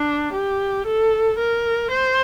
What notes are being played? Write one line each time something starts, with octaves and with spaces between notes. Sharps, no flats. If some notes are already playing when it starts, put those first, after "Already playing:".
Already playing: D4
G4
A4
A#4
C5